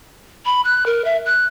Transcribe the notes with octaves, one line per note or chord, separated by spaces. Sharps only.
B5
F#6
A#4
E5
F#6